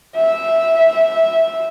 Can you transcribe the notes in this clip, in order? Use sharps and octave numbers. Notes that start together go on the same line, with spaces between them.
E5